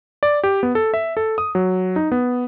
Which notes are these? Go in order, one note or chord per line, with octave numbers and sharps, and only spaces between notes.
D5
G4
B3
A4
E5
A4
D#6
F#3
D#4
B3